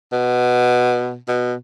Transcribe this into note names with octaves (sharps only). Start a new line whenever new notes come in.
B2
B2